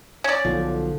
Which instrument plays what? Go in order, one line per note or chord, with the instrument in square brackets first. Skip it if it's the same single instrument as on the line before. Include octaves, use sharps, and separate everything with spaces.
[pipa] C#4 D5
[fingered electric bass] B1 F3 [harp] D3